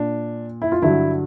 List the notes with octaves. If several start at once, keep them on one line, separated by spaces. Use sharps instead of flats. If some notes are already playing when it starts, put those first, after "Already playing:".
Already playing: A#2 D4
E4
F4
G2 D3 F#3 E4